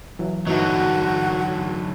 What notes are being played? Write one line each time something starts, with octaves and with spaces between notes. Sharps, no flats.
E3 F#3
G2 D3 E3 F#3 D#4 F#4